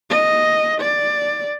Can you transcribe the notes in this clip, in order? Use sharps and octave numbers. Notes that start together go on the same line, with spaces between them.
D#5
D5